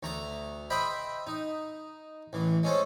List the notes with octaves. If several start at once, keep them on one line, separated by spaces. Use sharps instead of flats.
D2 A3 A#5
C5 D#5 E5 G5 B5
D#4
A1 E3
G#3 C#4 A4 C5